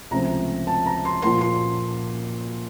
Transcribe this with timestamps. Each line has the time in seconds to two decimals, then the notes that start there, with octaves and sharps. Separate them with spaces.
0.11 C#2 C3 F3 A3 C4 A#5
0.67 A5
0.86 A#5
1.05 C6
1.22 A#2 F3 A#3 C6
1.41 C6